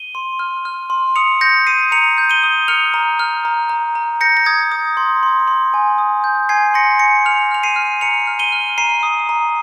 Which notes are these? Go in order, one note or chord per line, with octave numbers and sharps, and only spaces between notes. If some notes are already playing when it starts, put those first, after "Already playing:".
Already playing: D#7 G7
C6
F6
F6
C6
D#6 C#7 F7
G6 A#6 C#7
D#6 C7 D#7
A#5 C#7 F7
G6
D#7 G7
D#6
F6 C#7 F7
A#5
F6
A#5
A#5
A#5
G6 A#6 C#7
A#6
D#6 G#6
D#6
C6
C6
C6
G#5
D#6
G6
G#5 G#6 C7
C6 A#6 C#7
G#5 A#6 C#7
F6 C#7 F7
F6 F7
C7 D#7
F6
A#5 C#7 F7
F6
D#7 G7
F6
A#5 C7 D#7
D#6
A#5